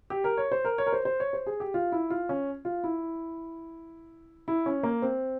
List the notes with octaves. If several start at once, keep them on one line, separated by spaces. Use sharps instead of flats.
G4
A#4
C#5
C5
A#4
C#5
A#4
C5
C5
C#5
C5
G#4
G4
F4
E4
F4
C#4
F4
E4
E4
C#4
A#3
C4